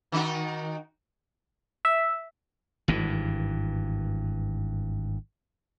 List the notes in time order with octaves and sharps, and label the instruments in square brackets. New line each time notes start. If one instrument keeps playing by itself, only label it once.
[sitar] D#3 D#4 F#4
[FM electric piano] E5
[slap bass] G#1 G2 E3